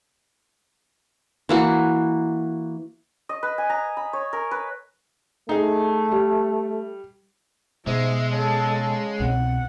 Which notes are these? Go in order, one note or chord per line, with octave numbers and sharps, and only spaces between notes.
E3 A#3 F#4
D#5
B4
G#5
A#5
B5
C#5
A#4
B4
A3 D#4 G#4
G3
G#2 B2 G#3 E5
C#3 A4
C2 B2 C4 F#5